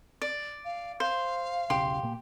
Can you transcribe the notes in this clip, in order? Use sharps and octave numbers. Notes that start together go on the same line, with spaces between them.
D5
F5
C5 F5
E1 B1 C#3 G4 C6
A#2 A#3